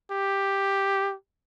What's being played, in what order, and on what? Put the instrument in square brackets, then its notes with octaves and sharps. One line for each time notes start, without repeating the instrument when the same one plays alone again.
[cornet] G4